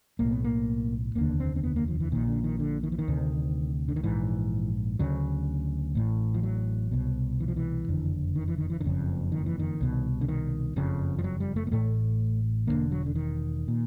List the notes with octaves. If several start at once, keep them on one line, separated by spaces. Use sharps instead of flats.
B1 A2 A#3
B3
A#3
F1 D#2 D3 A#3
C4
C4
B3
A#3
F3
E3
A#1 A#2 D#3
D3
D#3
D3
D#3
E3
D#3
D2 C3
D3
D#3
A#1 G#2 E3
D2 C#3 F#3
A1 A2
F3
F#3
C2 B2
E3
F3
E3
F#1 F2 D3
D#3
E3
D#3
E3
D#3
F#1 F2 C#3
D#3
E3
D#3
C2 B2
D3
D#3
F#1 F2 C#3
F3
F#3
G3
A3
A#3
A1 A2 A3
E1 D#2 D3 A#3
F#3
D3
D#3
A#2